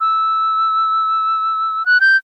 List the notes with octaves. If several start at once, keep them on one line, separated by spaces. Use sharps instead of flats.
E6
F#6
G6